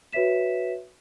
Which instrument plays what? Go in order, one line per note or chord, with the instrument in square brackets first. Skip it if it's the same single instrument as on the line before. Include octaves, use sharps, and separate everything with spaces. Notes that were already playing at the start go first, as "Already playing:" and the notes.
[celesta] F#4 B4 C#5 E5 B6 E7